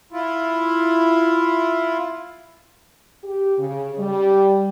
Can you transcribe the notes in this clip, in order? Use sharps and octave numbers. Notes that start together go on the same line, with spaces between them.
E4 F4
G4
C#3
G3